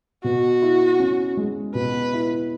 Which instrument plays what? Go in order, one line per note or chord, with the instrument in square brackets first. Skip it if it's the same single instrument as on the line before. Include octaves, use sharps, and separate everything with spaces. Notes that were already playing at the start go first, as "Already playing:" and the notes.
[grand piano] B2 [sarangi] F#4
[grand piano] E4
C#4
G#3
[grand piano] B2 [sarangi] B4
[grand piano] E4